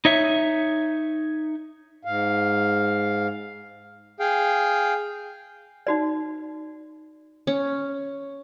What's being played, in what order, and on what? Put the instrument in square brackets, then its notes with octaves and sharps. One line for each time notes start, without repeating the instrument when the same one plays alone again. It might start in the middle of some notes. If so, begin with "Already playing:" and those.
[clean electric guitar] D#4 C#5 E5
[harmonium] G#2 F5
[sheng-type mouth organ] G#4 F5 G5
[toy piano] D#4 F#4 D5
[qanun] C#4